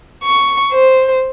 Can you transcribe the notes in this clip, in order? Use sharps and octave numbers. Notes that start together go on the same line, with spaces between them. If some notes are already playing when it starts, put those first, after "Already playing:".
C#6
C5